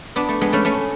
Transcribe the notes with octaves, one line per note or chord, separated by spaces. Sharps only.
B3 D4
A3
G#3 B3
A3 C#4
A3 C#4